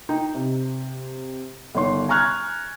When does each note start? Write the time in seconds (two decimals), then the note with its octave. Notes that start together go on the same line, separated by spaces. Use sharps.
0.09 D#4 G5
0.35 C3
1.75 G1 D#3 C#5 C6
2.09 G#5 A#5 C#6 F6 F#6 G#6